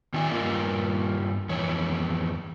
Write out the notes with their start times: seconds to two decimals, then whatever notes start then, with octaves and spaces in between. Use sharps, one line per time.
0.14 D#3 C#4 F4 D5 E5 G#5
0.31 G2 A#3 F4 A#4 D#5
1.49 F2 E3 C#5